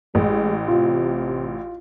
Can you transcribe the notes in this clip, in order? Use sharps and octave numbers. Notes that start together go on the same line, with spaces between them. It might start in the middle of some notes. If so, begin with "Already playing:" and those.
A1 G#3
C3 F4